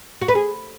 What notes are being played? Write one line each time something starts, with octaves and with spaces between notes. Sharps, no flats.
F#4
B4
G#4